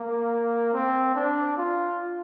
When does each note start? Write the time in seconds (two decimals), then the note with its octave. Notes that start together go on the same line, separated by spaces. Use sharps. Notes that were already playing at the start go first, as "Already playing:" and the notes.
Already playing: A#3
0.73 C4
1.15 D4
1.57 F4